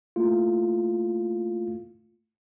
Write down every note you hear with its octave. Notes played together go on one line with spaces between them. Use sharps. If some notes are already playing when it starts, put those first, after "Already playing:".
A3 A#3 E4 F4